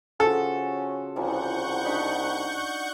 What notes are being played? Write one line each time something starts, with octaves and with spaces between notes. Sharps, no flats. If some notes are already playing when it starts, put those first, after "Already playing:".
C#3 F3 C#4 F#4 A4
C2 E3 F3 F#5 C#6 G6
D4 D#4 B5